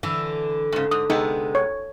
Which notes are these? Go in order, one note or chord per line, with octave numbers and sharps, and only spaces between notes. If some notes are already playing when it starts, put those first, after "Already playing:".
D3 E3
G#2 C#3
G#2 D#6
C3 G#3 B3 D#4
C#5